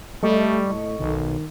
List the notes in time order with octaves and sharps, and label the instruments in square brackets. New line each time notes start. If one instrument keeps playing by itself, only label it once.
[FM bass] G3 [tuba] A3 [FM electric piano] A4 D#5 C#6
[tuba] A2
[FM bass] B1 [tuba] D#3